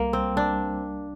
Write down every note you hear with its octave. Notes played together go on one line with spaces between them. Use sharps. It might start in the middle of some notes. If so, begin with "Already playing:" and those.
Already playing: C2 G3 A#3
C4
D4